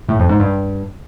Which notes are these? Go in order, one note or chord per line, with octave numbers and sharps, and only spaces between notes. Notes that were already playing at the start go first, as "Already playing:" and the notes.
A2
F2
G#2
G2